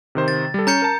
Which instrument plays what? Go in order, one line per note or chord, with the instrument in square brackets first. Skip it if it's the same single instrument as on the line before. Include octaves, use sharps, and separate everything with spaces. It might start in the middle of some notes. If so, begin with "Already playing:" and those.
[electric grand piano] C3 D#3 C5
[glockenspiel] A6
[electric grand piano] G3 A4
[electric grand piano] C#4 [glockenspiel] A#5 G6 C#7
[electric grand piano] A#4 A5